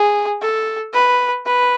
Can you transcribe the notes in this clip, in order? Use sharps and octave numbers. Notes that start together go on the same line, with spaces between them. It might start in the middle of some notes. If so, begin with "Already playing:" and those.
Already playing: G#4
A4
B4
B4